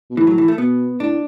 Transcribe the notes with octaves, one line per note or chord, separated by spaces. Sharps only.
B2
A2 E3
F#3
E3
A3
B2 B3
A2 D4